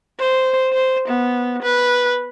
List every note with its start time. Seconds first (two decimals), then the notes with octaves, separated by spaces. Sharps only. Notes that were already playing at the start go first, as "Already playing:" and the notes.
0.19 C5
0.73 C5
1.08 B3
1.62 B4